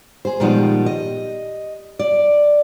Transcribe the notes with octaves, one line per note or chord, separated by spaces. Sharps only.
G#4 C5
A#2 D#3 F3 G3 G#3 B3
D#5
D5